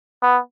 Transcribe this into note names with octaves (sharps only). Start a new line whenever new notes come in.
B3